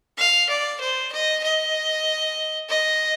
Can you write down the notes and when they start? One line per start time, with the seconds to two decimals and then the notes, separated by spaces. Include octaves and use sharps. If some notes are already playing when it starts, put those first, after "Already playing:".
0.17 F5
0.49 D5
0.80 C5
1.12 D#5
1.43 D#5
2.69 D#5